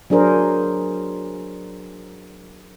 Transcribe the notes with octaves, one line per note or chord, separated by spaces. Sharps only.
F#3 D4 G#4 A#4 C5